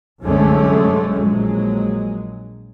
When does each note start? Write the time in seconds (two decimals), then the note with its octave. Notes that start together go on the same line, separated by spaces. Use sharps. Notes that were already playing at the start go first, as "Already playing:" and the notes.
0.22 C2 F#2 D3 G#3 A3 C#4
1.13 A#1 F#3 G#3